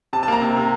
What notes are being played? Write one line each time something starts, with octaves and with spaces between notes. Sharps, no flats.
C3 A5
A5
A#3 A#5
C3
C3